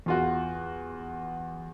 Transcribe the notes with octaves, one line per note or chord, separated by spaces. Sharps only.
E2 F4 F#4